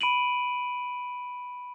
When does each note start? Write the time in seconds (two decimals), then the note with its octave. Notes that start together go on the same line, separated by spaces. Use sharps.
0.01 B5 D7 D#7 F#7